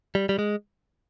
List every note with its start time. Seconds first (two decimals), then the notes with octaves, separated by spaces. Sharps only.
0.15 G3
0.29 G3
0.39 G#3